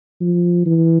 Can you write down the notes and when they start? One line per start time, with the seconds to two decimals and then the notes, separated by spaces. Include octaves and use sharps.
0.21 F3
0.66 E3